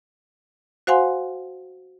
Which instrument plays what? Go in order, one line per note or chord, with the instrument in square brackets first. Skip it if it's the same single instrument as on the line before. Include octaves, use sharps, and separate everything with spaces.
[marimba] F#4 C5 F5 F#5 G#5 C6